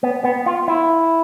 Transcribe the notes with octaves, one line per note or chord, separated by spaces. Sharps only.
B3
B3
F4
E4